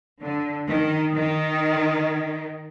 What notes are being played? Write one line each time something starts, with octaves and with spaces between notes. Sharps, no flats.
D3
D#3
D#3